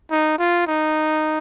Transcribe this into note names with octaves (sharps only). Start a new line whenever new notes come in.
D#4
F4
D#4